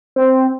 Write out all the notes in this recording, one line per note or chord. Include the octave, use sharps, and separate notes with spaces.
C4